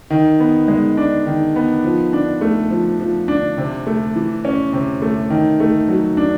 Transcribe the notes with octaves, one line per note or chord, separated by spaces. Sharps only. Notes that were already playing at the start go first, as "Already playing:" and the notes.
D#3
B3
G#3
D4
D#3
B3
F3
D4
A3
F3
F3
D4
C3
A3
E3
C#4
C3
A3
D#3
A3
F#3
D4